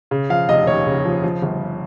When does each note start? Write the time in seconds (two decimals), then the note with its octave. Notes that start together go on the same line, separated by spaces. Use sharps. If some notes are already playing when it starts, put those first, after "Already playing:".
0.11 C#3
0.30 F3 F5
0.48 F1 D#5
0.67 D#2 C#5
0.86 C#3
1.05 F3
1.24 F3
1.42 G1